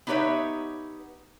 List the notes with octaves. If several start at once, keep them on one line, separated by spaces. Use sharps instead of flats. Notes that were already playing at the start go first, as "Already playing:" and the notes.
B3 D#4 G4 B4 C#5 E5